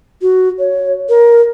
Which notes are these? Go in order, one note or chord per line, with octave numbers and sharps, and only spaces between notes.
F#4
C#5
A#4